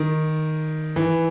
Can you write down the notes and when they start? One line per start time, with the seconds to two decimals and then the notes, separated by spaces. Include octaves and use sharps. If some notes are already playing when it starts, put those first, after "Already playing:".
Already playing: D#3
0.96 E3